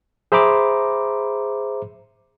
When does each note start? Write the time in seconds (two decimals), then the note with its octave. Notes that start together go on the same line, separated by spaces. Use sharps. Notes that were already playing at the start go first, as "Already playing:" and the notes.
0.32 G#4 C5 E5 A#5 B5 D6